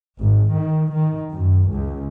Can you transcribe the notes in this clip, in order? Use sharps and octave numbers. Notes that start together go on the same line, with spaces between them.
G#1
D#3
D#3
F#2
C#2